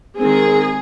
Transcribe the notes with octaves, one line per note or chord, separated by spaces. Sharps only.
D#3 G#3 C4 G#4